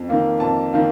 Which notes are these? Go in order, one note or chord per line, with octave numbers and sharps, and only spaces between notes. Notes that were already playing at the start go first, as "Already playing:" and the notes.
Already playing: F2
D#3 A#3 F4
F2 A5
D#3 A#3 F4